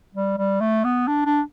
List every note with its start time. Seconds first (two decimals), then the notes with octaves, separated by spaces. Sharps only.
0.15 G3
0.38 G3
0.61 A3
0.84 B3
1.08 D4
1.26 D4